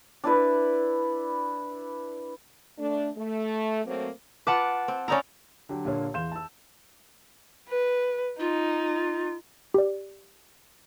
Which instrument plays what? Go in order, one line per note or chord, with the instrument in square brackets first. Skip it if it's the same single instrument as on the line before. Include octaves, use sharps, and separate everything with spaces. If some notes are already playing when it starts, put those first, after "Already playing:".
[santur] D4 E4 B4
[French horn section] A3 D4
A3
F#3 A3 A#3 C4
[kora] F4 B4 [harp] F#5 A5 D6
[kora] C4
[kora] C#4 D#4 E4 [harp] D5 A#5
[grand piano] D3 F#3 G4
[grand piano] A#2 D3 A#3 [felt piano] G4 C#5
[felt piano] E2 F5 C6 [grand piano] G6 E7
[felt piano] A5 E6
[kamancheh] B4
[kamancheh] D#4 [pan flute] F4
[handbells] G4 D5